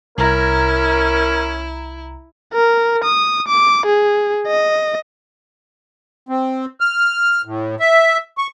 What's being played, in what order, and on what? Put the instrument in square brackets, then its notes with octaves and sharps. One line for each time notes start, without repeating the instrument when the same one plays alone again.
[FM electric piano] C2 A#5 [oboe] C#4 [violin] E4 [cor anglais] A#4
[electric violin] A#4
D#6
D6
G#4
D#5
[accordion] C4
F6
A2
E5
C#6